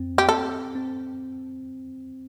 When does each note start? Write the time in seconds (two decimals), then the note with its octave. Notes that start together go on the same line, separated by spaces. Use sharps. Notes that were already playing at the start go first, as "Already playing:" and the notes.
Already playing: F2 C4
0.18 G4
0.27 C4 A4
0.75 C4